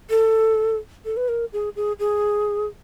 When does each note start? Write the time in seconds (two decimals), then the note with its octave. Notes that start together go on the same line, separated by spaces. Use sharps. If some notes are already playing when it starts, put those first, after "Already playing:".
0.10 A4
1.05 A4
1.17 B4
1.28 A#4
1.53 G#4
1.76 G#4
1.99 G#4